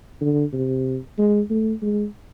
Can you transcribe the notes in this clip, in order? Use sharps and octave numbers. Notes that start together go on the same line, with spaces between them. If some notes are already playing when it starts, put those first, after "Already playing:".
D3
C3
G#3
A3
G#3